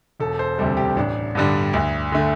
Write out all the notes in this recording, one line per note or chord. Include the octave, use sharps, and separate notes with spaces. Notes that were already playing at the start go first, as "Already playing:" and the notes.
E1 A4
C5
D2 C3 G3 A4
G4
A1 D4
G2 D3 G3
D2
D3 A3